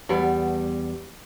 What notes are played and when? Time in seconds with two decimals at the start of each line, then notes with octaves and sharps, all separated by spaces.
0.09 E2 G3 B3